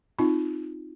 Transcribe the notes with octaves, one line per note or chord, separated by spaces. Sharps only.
C4 D#4 F4